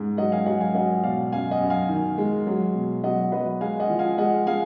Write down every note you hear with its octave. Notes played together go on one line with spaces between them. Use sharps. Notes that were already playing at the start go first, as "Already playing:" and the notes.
Already playing: G#2
F#3 D#5 F#5
F5 G#5
F#3 D#5 F#5
F5 G#5
F#3 D#5 F#5
B2 D5 F5
F#2 F5 G#5
D#5 F#5
F#2
F5 G#5
D#3
G#3
F#3
B2
F#3 D#5 F#5
F#3 B4 D#5
G#3 F5 G#5
D#5 F#5
F3
F5 G#5
G#3 D#5 F#5
G#3 F5 G#5